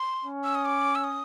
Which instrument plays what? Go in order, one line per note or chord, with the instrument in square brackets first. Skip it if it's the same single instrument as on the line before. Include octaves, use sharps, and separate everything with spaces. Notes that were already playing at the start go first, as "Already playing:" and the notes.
Already playing: [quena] C6
[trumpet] C#4
[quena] E6
D#6
D6
E6
D#6